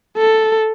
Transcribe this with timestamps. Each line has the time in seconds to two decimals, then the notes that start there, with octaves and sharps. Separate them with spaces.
0.18 A4